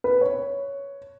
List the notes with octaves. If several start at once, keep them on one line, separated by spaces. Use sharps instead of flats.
B4
C#5